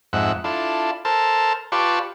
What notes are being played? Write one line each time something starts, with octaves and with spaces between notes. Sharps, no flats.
F2 G#2 E5 F#5
D4 E4 F4 A4
A4 A#4 C5 A5
F4 G4 B4 D5 A5 C#6